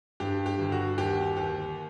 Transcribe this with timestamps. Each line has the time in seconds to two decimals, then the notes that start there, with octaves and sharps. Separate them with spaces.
0.20 G2 G4
0.46 G4
0.59 G1
0.72 F#4
0.98 D#2 G4
1.37 D#2 G4